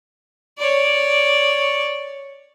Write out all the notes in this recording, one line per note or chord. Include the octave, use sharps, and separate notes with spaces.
C#5 D5